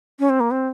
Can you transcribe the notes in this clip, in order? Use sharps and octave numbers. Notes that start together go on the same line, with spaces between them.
C#4
C4
A#3
C4